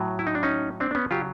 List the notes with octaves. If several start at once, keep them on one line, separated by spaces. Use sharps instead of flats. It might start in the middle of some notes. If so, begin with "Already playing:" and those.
Already playing: A2 F#3
E4
D#4
D4
C#4 D#4
C4 D4
D4
B3 C#4
C#3 F#3 F4 G4